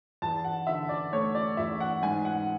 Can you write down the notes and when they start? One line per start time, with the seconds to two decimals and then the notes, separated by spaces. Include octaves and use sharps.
0.22 E2 A5
0.45 F#5
0.67 D3 E5
0.89 D5
1.13 A3 C#5
1.35 D5
1.57 E2 E5
1.80 F#5
2.03 G#2 G#5
2.25 F#5